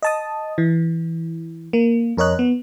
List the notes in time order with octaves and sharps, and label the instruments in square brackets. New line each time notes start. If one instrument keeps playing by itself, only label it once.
[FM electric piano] D#5 A5 D#6
E3
A#3
F2 A#4 C#5 D#5 F#6
B3